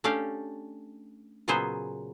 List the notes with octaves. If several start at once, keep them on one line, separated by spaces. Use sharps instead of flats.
A3 C#4 D4 G4 F5
A#2 C#3 F#3 B3 G#4 C5